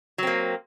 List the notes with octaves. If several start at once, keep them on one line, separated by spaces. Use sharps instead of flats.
F#3 A#3 C4